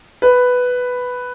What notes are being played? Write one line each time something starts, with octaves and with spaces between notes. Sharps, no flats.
B4